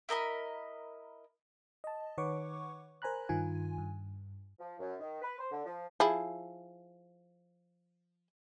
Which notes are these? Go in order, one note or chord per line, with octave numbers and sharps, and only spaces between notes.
E4 A#4 D#5 B5
D#5 A5
D#3 B4 C#5 F#5 C#6 D6
A#4 C5 G#5 A#5 B5 F#6
G2 D#3 F4 G#5
G2
F3
F#2
D#3
B4
C5
D3
F3
F3 E4 G#4